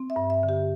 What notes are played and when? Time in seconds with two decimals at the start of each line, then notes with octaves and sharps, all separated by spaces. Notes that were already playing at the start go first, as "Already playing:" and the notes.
Already playing: C4
0.10 E5
0.16 G2
0.30 E5
0.43 D3
0.49 G4